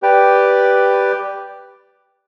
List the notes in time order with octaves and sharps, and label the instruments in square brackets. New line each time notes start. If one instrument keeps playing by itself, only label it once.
[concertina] G4 B4 D5 G5